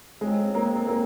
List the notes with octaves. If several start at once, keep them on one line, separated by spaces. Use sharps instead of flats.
F2 C#3 F#3 G#3 C4
A#3
A#3